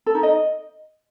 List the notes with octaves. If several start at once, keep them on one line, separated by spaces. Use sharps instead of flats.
A4
D#4
D#5